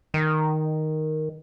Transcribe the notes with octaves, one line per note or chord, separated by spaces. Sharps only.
D#3